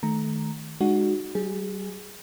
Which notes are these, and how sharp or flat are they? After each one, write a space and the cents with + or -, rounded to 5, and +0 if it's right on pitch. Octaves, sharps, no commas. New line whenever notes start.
D#3 +0 A3 -20 A#5 +0
G#3 +0 D#4 -40 F#4 +0
G3 -45 G#4 +0